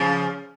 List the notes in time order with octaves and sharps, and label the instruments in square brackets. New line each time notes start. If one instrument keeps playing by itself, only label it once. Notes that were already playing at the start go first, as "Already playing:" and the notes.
Already playing: [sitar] C#3 F3